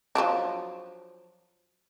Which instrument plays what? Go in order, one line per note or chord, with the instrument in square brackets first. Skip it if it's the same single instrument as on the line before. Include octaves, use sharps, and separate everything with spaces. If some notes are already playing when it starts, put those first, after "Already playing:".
[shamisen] F3 F#3 D4